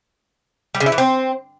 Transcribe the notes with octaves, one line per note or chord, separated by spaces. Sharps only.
G3
C#3
E4
E3
C4